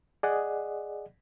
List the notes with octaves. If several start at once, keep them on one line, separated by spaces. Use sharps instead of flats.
G#4 D5 D#5 F#5